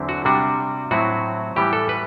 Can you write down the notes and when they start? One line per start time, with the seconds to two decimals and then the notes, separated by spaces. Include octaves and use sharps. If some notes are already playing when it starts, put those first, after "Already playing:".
Already playing: E2 D3 F#3 C4 E4
0.09 F#4
0.25 C3 G3 D4 F#4
0.91 A2 F#3 C4 E4 F#4
1.56 A2 E3 G3 B3 G4
1.73 A4
1.89 B4